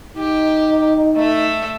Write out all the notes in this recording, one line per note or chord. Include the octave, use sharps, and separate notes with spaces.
D#4 G4
A3 E5